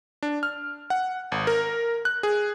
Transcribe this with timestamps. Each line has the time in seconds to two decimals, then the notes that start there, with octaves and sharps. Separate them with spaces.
0.23 D4
0.43 F6
0.90 F#5
1.32 G#1
1.47 A#4
2.05 F#6
2.23 G#4